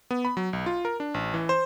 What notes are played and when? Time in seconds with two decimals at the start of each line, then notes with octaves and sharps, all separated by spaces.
0.11 B3
0.25 B5
0.37 F#3
0.53 B1
0.66 F4
0.85 A#4
1.00 D4
1.14 A1
1.34 E3
1.49 C5